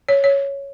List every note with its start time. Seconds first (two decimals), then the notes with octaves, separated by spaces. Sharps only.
0.09 C#5
0.24 C#5